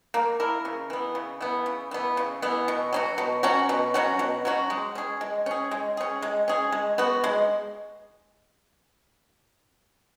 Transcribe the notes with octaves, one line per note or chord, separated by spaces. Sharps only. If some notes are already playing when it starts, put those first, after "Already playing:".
A#3
E4 A#4
C#3
E3 B3
C#3
E3 B3
C#3
E3 B3
C#3
E3 B3
B2
F#3 C#4 F#4
B2
F#3 C#4 F#4
B2
F#3 C#4 F#4
B2
F#3 C#4 F#4
G#3
C#4 G#4
G#3
C#4 G#4
G#3
C#4 G#4
G#3
C#4 G#4
G#3
B3 F#4
G#3